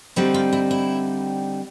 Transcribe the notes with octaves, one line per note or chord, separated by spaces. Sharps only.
D3 G3 C4 D#4 F#4
F4
E4
E4